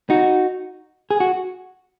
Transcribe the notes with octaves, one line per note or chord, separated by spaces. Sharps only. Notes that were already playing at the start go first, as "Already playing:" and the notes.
D#4 F#4
G#4
F#4